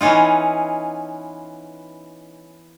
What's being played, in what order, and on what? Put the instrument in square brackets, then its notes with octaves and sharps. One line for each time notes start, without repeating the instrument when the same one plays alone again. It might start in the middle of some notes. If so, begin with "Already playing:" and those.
[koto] E3 B3 C#4 D#4 F4